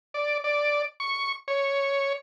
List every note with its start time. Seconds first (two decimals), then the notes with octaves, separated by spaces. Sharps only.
0.14 D5
0.44 D5
1.00 C#6
1.48 C#5